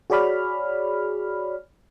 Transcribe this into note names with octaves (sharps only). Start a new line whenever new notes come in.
F#4 G#4 C#5 D5 B5 F6